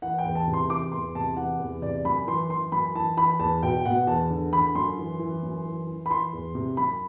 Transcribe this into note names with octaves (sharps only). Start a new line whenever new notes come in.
E3 F#5
G5
E2
A5
C3
C6
E3 D6
E2 C6
C3 A5
E3 F#5
E2
C3 D5
F#2 B5
E3 C6
E3 C6
F#2 B5
E3 A5
E3 B5
E2 A5
B2 G5
B2 F#5
E2 A5
D3
D3 B5
F#2 C6
E3
E3
F#2
E3
E3
B5
E3 C6
E2
C3
F#2 B5